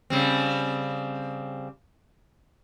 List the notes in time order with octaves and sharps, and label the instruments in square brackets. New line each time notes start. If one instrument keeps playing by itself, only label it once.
[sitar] C#3 G3 C4